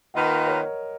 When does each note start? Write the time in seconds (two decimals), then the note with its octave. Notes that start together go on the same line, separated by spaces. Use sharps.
0.14 D#3 A#3 F4 B4 D#5 F#5
0.47 A#4 C#5